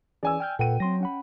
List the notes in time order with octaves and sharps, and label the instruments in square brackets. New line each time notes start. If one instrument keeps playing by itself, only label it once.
[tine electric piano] E3 C#4 G#4 [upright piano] D5 G#5 E6
[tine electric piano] G5 F6 G6
[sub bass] A#2 [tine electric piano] A4 B4 F#5 [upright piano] G5 D#7
[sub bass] F#3 [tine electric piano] C4 C6 A#6
[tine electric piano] C#4 F#5 B5